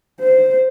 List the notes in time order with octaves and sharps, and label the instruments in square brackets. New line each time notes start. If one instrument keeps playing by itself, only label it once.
[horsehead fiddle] C5